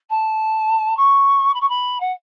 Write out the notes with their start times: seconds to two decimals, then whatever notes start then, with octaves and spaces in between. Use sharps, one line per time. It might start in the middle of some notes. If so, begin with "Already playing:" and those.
0.10 A5
0.97 C#6
1.54 B5
1.60 C#6
1.69 B5
2.00 F#5